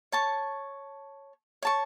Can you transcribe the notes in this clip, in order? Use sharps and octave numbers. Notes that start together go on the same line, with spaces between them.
C#5 A5 C#6
C#5 A5 C#6